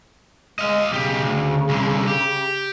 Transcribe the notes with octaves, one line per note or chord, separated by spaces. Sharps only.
G#3 D#5 F5
B1 C#3 G4
D2
C2 D3
G4